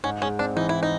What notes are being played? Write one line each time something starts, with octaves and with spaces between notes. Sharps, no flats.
G#2 C#4
G#3 C#4
C4 D4
E3 D#4
E4
D#4